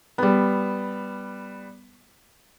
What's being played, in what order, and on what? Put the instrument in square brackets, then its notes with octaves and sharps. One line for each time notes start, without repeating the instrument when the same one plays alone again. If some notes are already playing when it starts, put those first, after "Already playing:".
[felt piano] G3 B3